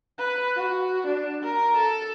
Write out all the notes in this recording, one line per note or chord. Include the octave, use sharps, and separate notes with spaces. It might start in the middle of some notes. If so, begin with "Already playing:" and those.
B4
F#4
D4
A#4
A4